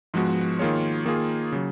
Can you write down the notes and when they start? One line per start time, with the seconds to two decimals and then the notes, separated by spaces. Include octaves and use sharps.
0.14 G#2 F3 G#3 B3 F#4
0.59 D#3 A#3 F4 G#4 C#5
1.05 D#3 A#3 F4 G#4
1.52 C#3 F#3